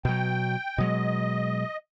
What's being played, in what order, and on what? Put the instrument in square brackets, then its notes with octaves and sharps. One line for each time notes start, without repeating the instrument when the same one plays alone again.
[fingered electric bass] B2 F#3 [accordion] G5
[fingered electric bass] B2 F#3 G#3 [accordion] D#5